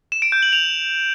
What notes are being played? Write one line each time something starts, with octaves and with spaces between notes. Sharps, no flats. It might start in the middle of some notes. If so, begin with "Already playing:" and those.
E7
D7
G6
F#7
F7